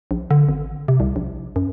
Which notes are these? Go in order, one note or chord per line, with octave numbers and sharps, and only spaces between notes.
A#1
D3
G#1
C3
C2
A#1
F#2